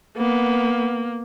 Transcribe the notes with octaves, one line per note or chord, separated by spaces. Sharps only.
A#3 B3